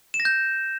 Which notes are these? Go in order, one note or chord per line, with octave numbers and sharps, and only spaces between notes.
E7
A#6
G6